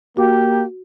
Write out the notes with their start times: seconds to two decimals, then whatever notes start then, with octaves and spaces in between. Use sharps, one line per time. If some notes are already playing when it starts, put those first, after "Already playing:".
0.17 A#3 F#4 G4 D6